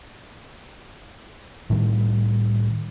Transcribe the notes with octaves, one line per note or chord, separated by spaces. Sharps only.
A2 D#3 G3